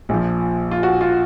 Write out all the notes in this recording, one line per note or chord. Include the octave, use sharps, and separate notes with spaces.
A#1 A#2 F3
F4
F#4
F4